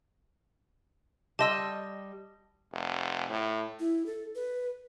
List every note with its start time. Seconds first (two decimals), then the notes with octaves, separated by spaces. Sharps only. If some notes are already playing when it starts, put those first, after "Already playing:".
1.39 G3 D#5 A5 C6 E6
2.72 F1
3.29 A2
3.80 E4
4.06 A4
4.35 B4